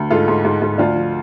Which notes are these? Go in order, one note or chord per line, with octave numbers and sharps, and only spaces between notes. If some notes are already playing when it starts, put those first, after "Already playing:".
Already playing: D2
G#2 F4 A4
G#2
G#2
G#2
D2 D4 F4
F3